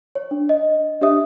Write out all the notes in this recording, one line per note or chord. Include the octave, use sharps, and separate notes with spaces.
C#5
D4
D#5
D4 G4 C#5 E5 D#6